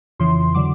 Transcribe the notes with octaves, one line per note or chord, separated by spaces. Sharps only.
F2 C#3 E3 C6
D3 F#3 D6